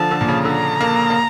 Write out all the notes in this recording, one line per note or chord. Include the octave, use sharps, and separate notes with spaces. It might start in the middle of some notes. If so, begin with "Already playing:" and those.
Already playing: D3 F3 A5
D3
A#2
C#3
D3 A#5
A#3
A#3